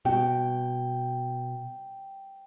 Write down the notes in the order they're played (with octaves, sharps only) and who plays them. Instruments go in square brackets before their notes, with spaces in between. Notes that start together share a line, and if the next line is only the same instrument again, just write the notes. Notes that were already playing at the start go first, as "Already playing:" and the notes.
[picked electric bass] B2 [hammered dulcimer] G5